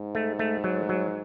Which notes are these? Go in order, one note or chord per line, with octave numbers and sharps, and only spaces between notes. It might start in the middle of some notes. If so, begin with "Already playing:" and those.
Already playing: G#2
A3
A3
F#3
F#3